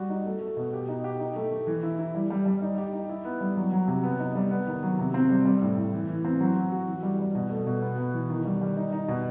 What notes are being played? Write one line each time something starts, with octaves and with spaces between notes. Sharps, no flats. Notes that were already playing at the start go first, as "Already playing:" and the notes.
Already playing: G3 F#4
D#4
A3
A3
B2
G4
D#4
G4
D#4
A3
A3
E3
E4
E4
G3
G3
G3
D#4
G4
D#4
E4
B3
G3
F#3
F#3
C3
B3
D#4
G3
B3
D#3
F#3
C3
C4
G3
G3
A2
A2
E3
E3
C4
F#3
F#4
F#4
E3
G3
G3
B2
A3
B2
B3
B3
E3
D#3
G3
G3
D#4
D#4
B2